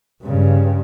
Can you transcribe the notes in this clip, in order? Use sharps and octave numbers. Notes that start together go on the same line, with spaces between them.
G2 C#3